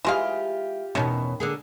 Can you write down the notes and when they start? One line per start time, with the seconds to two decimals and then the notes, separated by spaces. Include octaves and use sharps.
0.05 E3 G#3 F4 G4 F5
0.95 E2 B2 D#3 C#4
1.40 D3 A#3 G#4